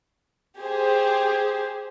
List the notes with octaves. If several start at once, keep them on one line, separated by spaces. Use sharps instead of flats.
G4 G#4 C5